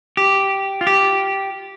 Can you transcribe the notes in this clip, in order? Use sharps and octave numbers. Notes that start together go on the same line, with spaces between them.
G4
F4
G4